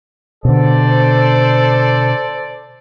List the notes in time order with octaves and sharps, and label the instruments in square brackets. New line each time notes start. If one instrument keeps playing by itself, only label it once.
[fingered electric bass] B2 D3 [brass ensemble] A4 C5 D5